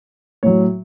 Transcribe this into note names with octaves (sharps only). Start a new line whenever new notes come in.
A2 F#3 C#5